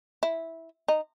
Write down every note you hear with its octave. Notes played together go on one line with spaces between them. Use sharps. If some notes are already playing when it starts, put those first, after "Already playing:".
E4
D#4